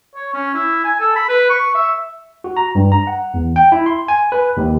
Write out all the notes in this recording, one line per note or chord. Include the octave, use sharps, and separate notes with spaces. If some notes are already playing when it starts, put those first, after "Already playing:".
C#5
C#4
E4
G#5
A4
B5
B4
C#6
E5
F#4
A#5
G2
A#5
F#5
E2
G5
E4
C6
G#5
B4
D#2